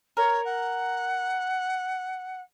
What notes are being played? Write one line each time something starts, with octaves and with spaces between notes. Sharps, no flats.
A#4 C#5
F#5